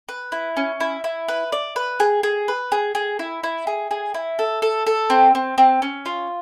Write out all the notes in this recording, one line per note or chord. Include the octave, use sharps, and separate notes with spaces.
B4
E4
C#4
E4
E4
B4
D5
B4
G#4
G#4
B4
G#4
G#4
E4
E4
G#4
G#4
E4
A4
A4
A4
C4
C4
C4
C#4
F4